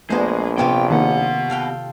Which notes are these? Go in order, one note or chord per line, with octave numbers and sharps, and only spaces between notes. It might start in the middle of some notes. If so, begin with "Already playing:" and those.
A#1 A#2 G#3 A3 B3 D4 C5 D#5
C3 B3 F4 C#5 G5
B2 D#3 A#3 F#5
A4 F5 G5